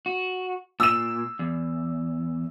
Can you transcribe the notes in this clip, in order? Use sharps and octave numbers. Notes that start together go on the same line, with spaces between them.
F#4
A#2 E6 E7
E2